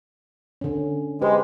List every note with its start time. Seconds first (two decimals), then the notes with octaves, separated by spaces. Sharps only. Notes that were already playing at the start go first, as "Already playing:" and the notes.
0.61 D3 C#4
1.22 G#3 G4 B4 C5